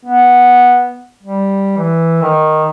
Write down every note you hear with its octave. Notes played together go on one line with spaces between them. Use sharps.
B3
G3
E3
D#3